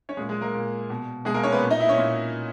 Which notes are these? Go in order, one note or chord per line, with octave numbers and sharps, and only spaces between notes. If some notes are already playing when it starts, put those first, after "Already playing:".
C#4 C#5
A#2 G#3 G#4
G#3 G#4
A#3 A#4
A#2
B2
B2 G#3 G#4
A#3 A#4
C#4 C#5
B3 B4
A#2
D#4 D#5
E4 E5
C#4 C#5
A#2